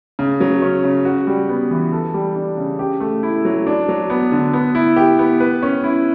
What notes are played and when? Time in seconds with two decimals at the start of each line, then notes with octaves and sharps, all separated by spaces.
0.19 C#3
0.40 F#3
0.62 C#4
0.84 C#3
1.05 F#4
1.27 G3
1.49 B3
1.71 E3
1.92 A4
2.14 G3
2.36 D4
2.58 C#3
2.79 G4
3.00 A3
3.23 E4
3.45 F#3
3.67 D4
3.89 F#3
4.10 B3
4.32 D3
4.53 B3
4.75 E4
4.96 G4
5.19 B3
5.40 B4
5.63 C#4
5.84 E4